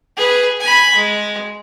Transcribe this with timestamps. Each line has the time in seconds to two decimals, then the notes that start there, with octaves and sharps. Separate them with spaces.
0.17 G#4 B4
0.61 G#5 B5
0.95 G#3